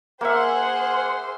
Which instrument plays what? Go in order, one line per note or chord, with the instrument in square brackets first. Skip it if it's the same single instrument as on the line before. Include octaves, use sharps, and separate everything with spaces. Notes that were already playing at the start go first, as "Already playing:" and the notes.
[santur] A#3 E5 [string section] G#4 C5 C6 [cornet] F#5